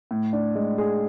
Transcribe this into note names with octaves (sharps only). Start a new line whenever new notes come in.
A2
D4
G#3
G#4